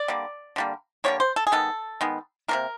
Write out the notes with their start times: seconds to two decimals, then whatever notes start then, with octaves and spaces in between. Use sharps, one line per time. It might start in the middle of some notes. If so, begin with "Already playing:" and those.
Already playing: D5
0.08 D3 G3 A#3
0.56 D3 G3 A#3
1.04 D3 G3 A#3 C#5
1.20 C5
1.36 A4
1.47 G#4
1.52 D#3 G#3 B3 A4
2.01 D#3 G#3 B3
2.48 C3 F3 A#3 A#4